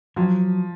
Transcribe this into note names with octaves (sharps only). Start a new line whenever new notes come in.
F3 F#3